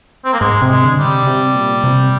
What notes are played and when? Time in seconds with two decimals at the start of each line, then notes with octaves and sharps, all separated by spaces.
0.25 C4
0.33 A#3
0.40 G#2 G#3
0.62 C3
0.68 G#3
0.83 D3
0.98 G3
1.04 C3
1.27 C3
1.54 A#2
1.84 C3